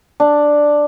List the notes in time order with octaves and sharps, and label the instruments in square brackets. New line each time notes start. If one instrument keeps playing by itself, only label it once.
[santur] D4